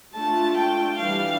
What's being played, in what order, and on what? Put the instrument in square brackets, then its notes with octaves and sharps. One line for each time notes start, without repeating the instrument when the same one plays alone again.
[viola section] A3 D4 F4 [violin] A5
[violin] G5
[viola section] E3 G3 D4 [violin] F5